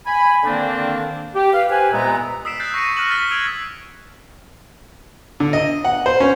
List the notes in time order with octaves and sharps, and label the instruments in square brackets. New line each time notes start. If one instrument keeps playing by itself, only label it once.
[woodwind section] G#5 B5
D3 D#3 A#3 C4 D4
G4
B4 F5
G4 B4 C5 G#5
C2 A#2 G#3 B3 E5 A#5
[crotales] D#6 E6 B6 C7 D7 E7
F#6 G6 A6 C7
C#6 A#6 C7 C#7 D#7
F6 F#6 A#6 C#7 E7 F#7
F6 A6 B6 C#7 G7
E6 F#6 G#6 D7 F7 F#7
[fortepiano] D3
D#5
F#5
C5
C#4